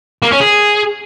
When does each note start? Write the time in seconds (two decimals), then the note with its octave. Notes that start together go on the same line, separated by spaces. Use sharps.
0.22 A#3
0.32 C#4
0.41 G#4